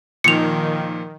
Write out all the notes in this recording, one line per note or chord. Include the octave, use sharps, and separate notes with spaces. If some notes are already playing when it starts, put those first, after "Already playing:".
A#2 D#3 F3 C#7 F7